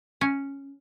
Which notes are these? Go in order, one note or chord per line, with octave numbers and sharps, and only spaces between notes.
C#4